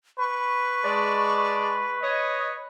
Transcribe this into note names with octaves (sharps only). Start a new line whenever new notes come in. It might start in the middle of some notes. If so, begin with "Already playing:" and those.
B4 C#6
G#3 D5 A5
C#5 D#5